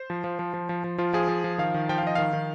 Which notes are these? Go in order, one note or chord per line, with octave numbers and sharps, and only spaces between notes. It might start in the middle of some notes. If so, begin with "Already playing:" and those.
Already playing: C5
F3
F3
F3
F3
F3
F3
F3 F4
F3 G#4
F3
F3
D#3 F5
D#3
F3 G5
F5
F3 D#5
D#3 F5
D#3